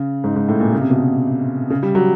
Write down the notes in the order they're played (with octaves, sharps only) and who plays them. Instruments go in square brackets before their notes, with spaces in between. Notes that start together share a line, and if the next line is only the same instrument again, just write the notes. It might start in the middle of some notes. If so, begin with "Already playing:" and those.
Already playing: [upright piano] C#3
G#2
G#2
A2
A#2
C#3
C3
B2
C3
C#3
G3
F#3